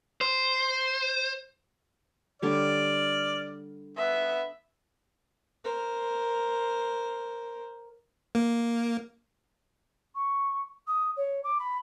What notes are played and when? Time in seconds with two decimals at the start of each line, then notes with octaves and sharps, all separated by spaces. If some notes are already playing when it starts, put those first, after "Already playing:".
0.21 C5
2.42 D3 G3 C#5 D5 F6
3.98 B3 E5
5.64 A#4 C5
8.35 A#3
10.15 C#6
10.87 D#6
11.16 C#5
11.43 D6
11.59 B5